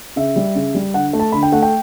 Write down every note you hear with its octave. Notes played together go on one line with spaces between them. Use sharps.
C#3 E5
G3
C#3
G3
D3 F#5
A3
A5
D3 B5
G5
A3 F#5
G5